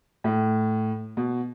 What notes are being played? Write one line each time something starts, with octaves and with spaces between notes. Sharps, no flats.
A2
B2